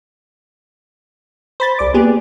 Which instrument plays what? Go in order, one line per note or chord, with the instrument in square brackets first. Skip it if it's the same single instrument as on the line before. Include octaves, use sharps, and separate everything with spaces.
[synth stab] C5 B5 A6
[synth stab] C2 D6 [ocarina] D5
[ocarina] A#3 [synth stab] B3 G4 G#4